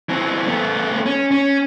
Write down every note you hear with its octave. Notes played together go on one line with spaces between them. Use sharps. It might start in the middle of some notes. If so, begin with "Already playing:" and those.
E3 C4
A3 B3
C#4
C#4